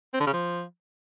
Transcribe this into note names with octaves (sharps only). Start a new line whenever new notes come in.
C4
D3
C#3
F3